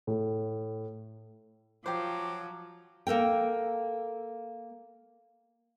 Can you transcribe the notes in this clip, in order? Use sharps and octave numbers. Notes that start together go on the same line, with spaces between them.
A2
F3 F#3 G4 C5 D6
A#3 A4 A#4 G5